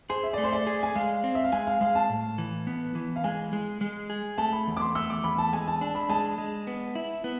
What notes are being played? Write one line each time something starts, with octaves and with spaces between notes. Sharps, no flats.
G#4 C5
E5
A3 D5
C5
D5
G#4
G#5
G#3 F5
C4
E5
F5
G#3 G#5
F5
G#3 F5
A5
A2
E3
B3
E3
F5
G#3 G#5
G#3
G#3
G#4
A3 A5
B5
E2
D6
C6
A3 E6
D6
E2 B5
A5
G#3 G#5
A5
D4 A5
B5
G#3 A5
G#3
B3
E4
B3